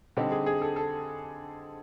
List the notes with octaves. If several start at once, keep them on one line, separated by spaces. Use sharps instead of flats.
D3 G3 C4 D#4 G4
G#4
G#4
A4
A4